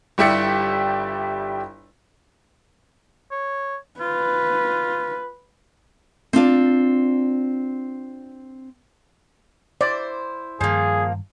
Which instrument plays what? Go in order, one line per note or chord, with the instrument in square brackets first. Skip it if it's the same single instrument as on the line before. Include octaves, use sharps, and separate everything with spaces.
[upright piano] G1 G3 E4 G4 D5 C#7
[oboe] C#5
[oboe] F4 [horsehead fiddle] B4
[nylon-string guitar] C4 D4 F4 D5
[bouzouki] E4 C5 [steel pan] D5
[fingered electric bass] G2 D#3 G3 [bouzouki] F3 A#3 [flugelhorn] G#4